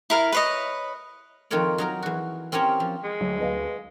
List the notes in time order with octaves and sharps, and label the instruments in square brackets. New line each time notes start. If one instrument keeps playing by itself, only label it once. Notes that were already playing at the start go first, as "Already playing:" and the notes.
[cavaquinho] E4 A#4 F5
B4 C#5 D#5
[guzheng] F2 D#3 F4 A#4 C#5 D5
F#3 D#4 A#4
E2 F#4
C4 C#4 G4 A#4 C#5
F3
[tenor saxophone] G#3
[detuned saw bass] D2 [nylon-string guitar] F#3
[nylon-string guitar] B4 D#5 F5